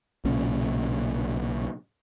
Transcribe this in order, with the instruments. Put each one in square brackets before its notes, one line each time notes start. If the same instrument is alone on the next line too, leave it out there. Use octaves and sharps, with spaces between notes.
[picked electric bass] B1 A#2 C#3 C#4